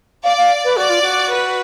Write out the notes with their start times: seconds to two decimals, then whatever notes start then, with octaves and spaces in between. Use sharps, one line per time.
0.24 D5 F5
0.37 F5
0.64 B4
0.77 F#4 D5
0.89 F4
1.02 F#4
1.31 B4